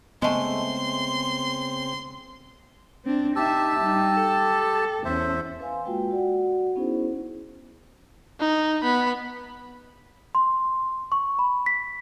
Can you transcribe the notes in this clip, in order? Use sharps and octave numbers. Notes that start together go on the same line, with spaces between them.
C#3 G#3 A3 B3 C4 C6
C4 D4
D#4 G4 E5 A5 E6
G3 D#4
A4
E2 C#4 C5 E5
B4 F5 G#5 C6
G#3 A#3 F4 F#4 B4 G5
F#4 D5 F#5
B3 C#4 D#4 E4 G#4 C5
D#4
B3 B5
C6
C#6
B5
B6